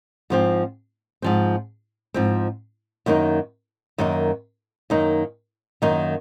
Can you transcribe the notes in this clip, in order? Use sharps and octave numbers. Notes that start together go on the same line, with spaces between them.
G#2 F3 C4
G#2 F3 C4
G#2 F3 C4
F#2 D#3 A#3 D#4
F#2 D#3 A#3 D#4
F#2 D#3 A#3 D#4
F#2 D#3 A#3 D#4